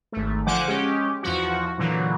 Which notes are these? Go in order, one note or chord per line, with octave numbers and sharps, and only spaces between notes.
G#1 A3
D3 F3 C5 F#5 G#5 D6
G#3 C#4 G4
E2 F3 F#4
A#2 D3 E3 F#3